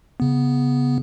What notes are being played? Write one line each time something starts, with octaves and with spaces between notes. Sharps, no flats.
C#3 B3